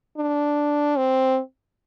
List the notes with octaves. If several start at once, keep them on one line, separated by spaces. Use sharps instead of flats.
D4
C4